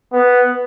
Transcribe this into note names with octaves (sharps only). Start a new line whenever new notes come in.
B3